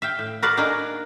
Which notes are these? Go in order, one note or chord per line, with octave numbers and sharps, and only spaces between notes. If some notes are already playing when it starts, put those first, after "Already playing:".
E5 F5 G5
A2
F#4 A#4 B4 D5 F5
A#3 D4 D#4 F#4 G#4 A#4